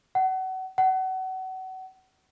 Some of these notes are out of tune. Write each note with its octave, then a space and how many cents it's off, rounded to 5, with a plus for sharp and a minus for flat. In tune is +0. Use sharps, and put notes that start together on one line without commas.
F#5 +30
F#5 +30